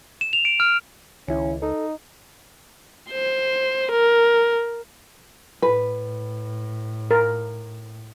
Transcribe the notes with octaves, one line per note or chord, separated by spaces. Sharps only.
E7
F7
D7
F6
C#2 D#3 C#4 E4
D#4 A4
C5
A#4
A2 B4
A#4